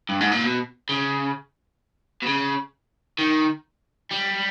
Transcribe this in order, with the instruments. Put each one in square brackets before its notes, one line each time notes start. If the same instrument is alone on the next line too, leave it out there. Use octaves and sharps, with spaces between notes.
[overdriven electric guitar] G2
G#2
A#2
B2
C#3
B2
C#3
D#3
G3